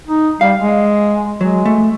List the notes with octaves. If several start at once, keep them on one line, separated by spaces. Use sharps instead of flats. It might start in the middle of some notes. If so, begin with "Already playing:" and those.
D#4
G3 F5
G#3
F#3 G#3
A3